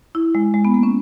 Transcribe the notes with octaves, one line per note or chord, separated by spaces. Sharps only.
E4
G#3
G#3
B3
A#3
C#4